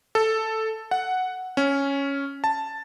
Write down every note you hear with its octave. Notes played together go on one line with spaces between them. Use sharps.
A4
F#5
C#4
A5